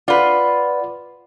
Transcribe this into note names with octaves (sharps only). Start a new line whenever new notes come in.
F4 B4 D5 F#5